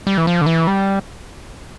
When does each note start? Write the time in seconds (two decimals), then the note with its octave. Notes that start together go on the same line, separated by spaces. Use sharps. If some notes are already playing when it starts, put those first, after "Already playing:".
0.07 G3
0.18 E3
0.27 F3
0.41 D3
0.46 E3
0.67 G3